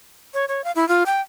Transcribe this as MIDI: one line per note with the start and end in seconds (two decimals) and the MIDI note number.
0.34 0.45 73
0.48 0.64 73
0.64 0.71 77
0.75 0.87 64
0.88 1.03 65
1.06 1.20 79